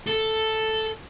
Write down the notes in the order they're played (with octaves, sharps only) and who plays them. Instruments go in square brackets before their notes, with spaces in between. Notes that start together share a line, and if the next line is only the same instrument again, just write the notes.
[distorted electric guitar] A4